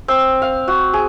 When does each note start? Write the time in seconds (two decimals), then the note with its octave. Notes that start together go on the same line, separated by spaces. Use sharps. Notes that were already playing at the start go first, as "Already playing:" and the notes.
0.08 C4
0.42 F5
0.68 F#4
0.93 G#4